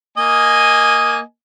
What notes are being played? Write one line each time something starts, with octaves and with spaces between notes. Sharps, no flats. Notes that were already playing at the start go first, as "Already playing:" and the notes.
A#3 D#5 G#5